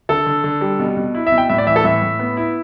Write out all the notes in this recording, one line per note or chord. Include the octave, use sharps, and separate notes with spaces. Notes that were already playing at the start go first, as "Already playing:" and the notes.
D3 A4
D3
D3
G3
B2
B2
E4
E5
B2
G5
A2 E5
D5
E3 E5
A4
A2 E5
A2
B3
E4